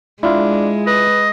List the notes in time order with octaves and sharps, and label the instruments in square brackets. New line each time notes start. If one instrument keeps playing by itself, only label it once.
[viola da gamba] G#3 [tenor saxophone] D4 [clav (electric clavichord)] E4 F4
[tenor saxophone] B4 [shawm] D#5